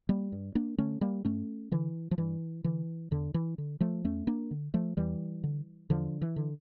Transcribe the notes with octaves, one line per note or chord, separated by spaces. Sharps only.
G3 A#3
G2
A#3 D4
D3 A3 C#4
G3 A#3
G2 A3 C#4
D3 E3
F3
G2 E3
D3 E3
E2 D3
E3
D3
F3 A3
E2 A3 C#4
A#3 D4
D3
F3 A3
E2 E3 G3
D3
E2 D3 F3
E3
D3